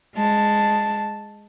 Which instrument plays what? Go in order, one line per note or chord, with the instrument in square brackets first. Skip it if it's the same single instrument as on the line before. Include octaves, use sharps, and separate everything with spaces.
[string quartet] G#3 A5